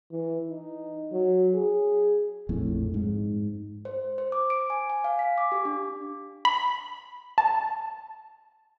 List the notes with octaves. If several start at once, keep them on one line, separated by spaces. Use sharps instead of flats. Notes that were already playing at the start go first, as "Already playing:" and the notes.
E3
D#4
F#3
G#4
A#1 F2 A2
G#2
C5
C5
D6
D7
G#5
G#5
F5
B6
D6
G4
D4
B5
A5